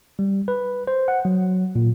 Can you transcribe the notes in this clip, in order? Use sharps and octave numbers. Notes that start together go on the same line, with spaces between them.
G3
B4
C5
F#5
F#3
A#2